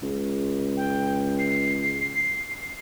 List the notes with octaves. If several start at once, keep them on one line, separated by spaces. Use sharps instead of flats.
C#2
G5
C7